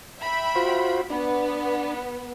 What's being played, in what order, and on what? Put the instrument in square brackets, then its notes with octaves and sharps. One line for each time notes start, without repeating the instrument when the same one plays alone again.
[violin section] E5 G5 B5
[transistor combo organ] F4 F#4 C5
[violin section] B3 [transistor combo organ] D4